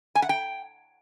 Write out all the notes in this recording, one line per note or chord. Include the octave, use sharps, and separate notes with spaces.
G#5
F#5
G5